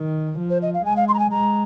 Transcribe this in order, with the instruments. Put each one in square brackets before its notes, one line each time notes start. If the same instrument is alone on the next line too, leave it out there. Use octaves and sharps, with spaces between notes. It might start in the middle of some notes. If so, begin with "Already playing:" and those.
Already playing: [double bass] D#3
F3
[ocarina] C5
D#5
F5
[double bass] G#3 [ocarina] G#5
[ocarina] F5
C6
A#5
G#5
[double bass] G#3 [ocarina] A#5